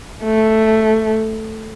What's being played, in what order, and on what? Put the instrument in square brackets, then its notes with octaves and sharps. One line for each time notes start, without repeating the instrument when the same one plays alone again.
[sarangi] A3